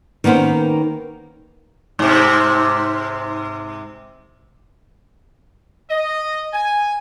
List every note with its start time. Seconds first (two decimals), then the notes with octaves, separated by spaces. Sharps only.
0.24 D#3 A#3 B3 C#4 C5
1.99 G#2 C3
5.90 D#5
6.54 G#5